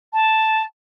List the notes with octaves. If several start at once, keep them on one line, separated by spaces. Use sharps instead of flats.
A5